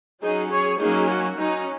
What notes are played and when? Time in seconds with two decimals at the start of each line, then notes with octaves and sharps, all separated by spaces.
0.22 F#3 C#4 D#4 G#4
0.50 G#4 C#5
0.79 F#3 A#3 C#4 D#4 G#4
1.09 F#4
1.37 F#3 C#4 D#4